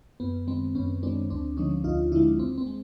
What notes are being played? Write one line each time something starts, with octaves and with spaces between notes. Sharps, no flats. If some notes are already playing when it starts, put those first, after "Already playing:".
F#2 B3
D#3 G#3 C4
F#2 B3 C#4
D#3 G#3 C4 D4
D2 C4 D4
D3 F3 G#3 C#4 D#4
D2 D#4 F4
D3 F3 G#3 D4 E4
D#2 C4
C4
G#3